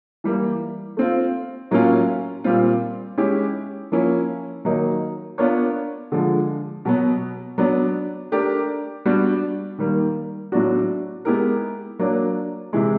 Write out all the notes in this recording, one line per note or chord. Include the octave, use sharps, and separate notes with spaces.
E3 G3 A#3
A3 C4 F4
A2 F#3 A#3 C#4 F4
A#2 G3 C4 F4
G#3 C#4 E4 G4
F3 A#3 C#4 E4
D#3 F#3 A#3 D#4
B3 D4 F4 A#4 C#5
D3 F3 G#3
B2 F#3 B3
F#3 B3 D4
A3 D4 G4 A#4
G3 B3 D4 F#4
D#3 G3 A#3
A2 F#3 B3 D4 F#4
G#3 B3 E4 G4 A#4
F#3 A#3 D4
C3 E3 G#3